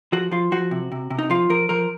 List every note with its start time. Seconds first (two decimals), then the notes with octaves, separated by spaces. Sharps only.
0.13 F3 F#4
0.31 F3 F4
0.52 F3 F#4
0.71 C3
0.92 C3
1.10 C3
1.19 D#4
1.30 F3 F4
1.50 F3 A#4
1.69 F3 A#4